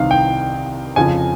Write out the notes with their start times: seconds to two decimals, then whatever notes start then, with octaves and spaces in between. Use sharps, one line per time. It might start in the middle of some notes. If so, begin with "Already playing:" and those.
Already playing: C2 C3 D#3 F5
0.11 G5
0.96 F2 C#3 F3 G#5